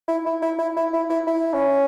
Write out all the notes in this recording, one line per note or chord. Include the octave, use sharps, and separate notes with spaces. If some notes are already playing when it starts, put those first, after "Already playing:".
E4
E4
E4
E4
E4
E4
E4
E4
C#4